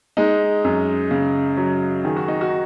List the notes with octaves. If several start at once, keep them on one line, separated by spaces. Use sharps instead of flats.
G#3 D#4
F#2
C#3
F#3
D#3 G#4
F#4
D#4
F#4